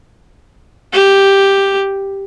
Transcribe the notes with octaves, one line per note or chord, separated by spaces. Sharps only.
G4